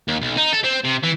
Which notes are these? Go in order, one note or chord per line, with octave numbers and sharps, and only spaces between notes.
D#2
B1
D#4
A4
C4
C3
E3